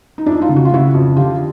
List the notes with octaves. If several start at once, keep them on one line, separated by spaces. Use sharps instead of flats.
D#4
F2 D4 E4
E4
D#4 F4
C#3
F#4
F4
C#3 E4 F#4
F2
D3 F4 G4